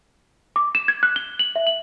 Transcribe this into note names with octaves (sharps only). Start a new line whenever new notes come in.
D6
E7
G#6
F#6
G7
F#7
E5
F#7